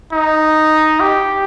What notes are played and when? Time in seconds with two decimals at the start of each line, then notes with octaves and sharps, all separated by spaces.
0.12 D#4
1.00 G4